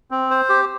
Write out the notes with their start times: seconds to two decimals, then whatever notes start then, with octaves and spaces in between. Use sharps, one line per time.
0.11 C4
0.31 C5
0.49 G4